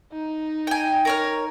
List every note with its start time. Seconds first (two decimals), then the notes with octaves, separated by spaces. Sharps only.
0.12 D#4
0.67 G5 G#5
1.05 A#4 C#5 F6